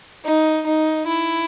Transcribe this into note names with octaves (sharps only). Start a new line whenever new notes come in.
D#4
D#4
E4